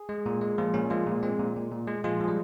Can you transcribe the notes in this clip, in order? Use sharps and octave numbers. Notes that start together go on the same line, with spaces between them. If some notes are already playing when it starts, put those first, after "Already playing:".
Already playing: G#4
G#3
A#2
G#3
A#2 F3 F4
A#2 C#4
F3 G#3 F4
A#2
G#3 C4
A#2
A#2
A#2
G#3
F3 G#3 F4
F3 G#4
G3